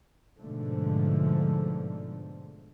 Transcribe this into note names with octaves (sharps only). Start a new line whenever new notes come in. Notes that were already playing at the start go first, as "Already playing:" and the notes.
G#2 B2 D3 F3 A3